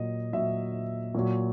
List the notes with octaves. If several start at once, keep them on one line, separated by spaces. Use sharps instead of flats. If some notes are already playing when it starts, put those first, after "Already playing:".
Already playing: A#2 F#3 D#5
A#2 F#3 E5
A#2 F#3